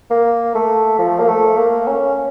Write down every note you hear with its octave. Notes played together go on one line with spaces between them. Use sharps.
A#3
A3
F3
A#3
A3
A#3
C#4